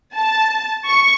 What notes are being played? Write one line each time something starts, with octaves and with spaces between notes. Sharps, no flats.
A5
C#6